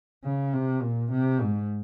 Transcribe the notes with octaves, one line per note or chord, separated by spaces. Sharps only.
C#3
C3
A#2
C3
G#2